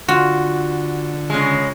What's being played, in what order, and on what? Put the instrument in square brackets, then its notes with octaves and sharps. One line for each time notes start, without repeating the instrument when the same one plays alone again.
[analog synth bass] D3 [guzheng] F4 [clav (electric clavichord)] F#4
[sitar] C#3 G#3